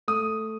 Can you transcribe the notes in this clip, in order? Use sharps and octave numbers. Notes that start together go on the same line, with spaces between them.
A3 D#6